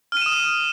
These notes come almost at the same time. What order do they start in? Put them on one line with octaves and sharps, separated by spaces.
F6 D#7 E7 D#6